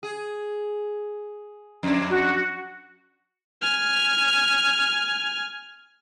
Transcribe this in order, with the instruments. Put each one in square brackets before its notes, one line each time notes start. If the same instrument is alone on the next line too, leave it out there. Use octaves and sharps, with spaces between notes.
[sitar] G#4
F2 D4
[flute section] F#4
[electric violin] G#5 F6